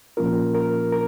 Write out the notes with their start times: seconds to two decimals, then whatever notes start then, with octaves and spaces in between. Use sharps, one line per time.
0.17 A#2 F3 A#3 C#4 F4 A#4
0.55 A#4
0.92 A#4